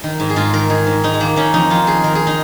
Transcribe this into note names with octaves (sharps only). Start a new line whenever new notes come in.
D#3
G#2
G#4
G#2 F4
D#3 A#4
D#3 G#4
G#2
G#2 D#4
G#3
D#3 A#3
D#3 C#4
F2 D#4
F2 F4
D#3 G#4
D#3 A#4
G#4
D#4